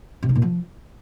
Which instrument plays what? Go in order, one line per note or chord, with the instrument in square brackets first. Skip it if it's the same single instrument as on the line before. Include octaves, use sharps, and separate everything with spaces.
[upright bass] C3
D#4
A#2
F3